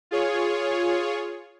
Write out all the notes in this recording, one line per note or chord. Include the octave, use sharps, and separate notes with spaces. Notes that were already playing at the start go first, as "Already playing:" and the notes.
F4 G#4 C#5